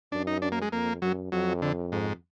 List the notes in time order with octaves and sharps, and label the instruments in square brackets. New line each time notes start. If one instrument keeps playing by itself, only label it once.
[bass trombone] F#2 [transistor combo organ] D4
[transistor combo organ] D#4
D4
A#3
G#3
[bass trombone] F2 [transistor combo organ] A#3
[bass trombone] F#2 [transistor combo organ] F#3
[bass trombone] F2 [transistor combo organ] F#3
[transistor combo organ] D3
G#2